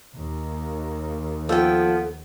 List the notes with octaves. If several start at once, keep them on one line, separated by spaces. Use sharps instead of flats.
D#2
F3 B3 A4 G5